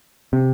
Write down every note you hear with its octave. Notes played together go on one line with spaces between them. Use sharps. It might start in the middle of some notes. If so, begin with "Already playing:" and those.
C3